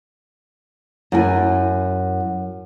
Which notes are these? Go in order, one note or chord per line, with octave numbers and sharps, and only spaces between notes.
F#2 E4 G#5